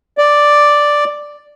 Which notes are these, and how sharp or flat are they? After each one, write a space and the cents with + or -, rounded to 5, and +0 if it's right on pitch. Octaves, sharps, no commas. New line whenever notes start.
D5 +0